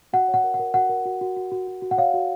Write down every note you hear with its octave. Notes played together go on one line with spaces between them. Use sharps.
F#4 F#5
C#5
F#5
A#4
F#5
A#4
F#4 F#5
A#4
F#4
F#4
F#4
F#4
F#4
F#4
F#5
C#5 F5
F#4